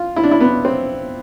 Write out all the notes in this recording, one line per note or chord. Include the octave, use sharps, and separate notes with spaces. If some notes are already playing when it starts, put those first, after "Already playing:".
Already playing: F4
E4
D4
E4
B3
C4